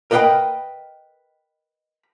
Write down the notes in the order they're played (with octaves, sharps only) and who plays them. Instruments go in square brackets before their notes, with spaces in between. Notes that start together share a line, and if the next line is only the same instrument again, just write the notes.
[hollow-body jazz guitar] A#4 B4 D#5 F5 G5 B5